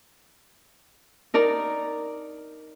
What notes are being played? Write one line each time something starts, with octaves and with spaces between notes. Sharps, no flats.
D#4 A#4 D5 A#5